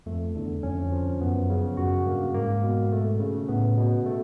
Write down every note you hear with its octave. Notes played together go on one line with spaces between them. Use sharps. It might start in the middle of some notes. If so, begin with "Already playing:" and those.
F2 A3
E2 D3
F2 C#4
F3
F#2 B3
C#3
F#2 F#4
G2 A#3
G#2 A#3
B2
A3
C#3
A2 B3
B2
A3